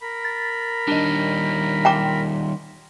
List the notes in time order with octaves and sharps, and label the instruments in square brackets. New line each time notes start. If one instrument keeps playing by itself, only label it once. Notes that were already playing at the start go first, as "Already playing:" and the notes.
[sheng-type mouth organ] A#4 B5
[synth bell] A6
[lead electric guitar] D#3 G3 [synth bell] D4 D#5
[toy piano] G5 A#5 D6 [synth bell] C6